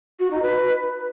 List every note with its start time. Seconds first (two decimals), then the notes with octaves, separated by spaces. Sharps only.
0.19 F#4
0.31 D#4
0.42 B4